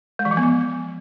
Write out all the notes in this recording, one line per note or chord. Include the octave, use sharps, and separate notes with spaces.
G#3
E3
F3
B3
F3